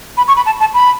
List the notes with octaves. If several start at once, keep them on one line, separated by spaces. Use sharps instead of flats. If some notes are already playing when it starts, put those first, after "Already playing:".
B5
C#6
B5
A5
A5
B5